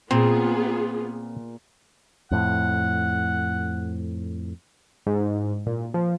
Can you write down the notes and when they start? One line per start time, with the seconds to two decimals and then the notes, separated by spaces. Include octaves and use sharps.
0.11 A#2 B3 C4 F4 G#4
2.31 F2 A2 F#5
5.07 G#2
5.66 A#2
5.94 F3